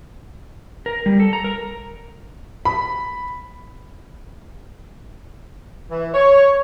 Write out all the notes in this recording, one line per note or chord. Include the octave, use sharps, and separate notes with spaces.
A#4
G3
A4
A#5
A#4
B5
E3
C#5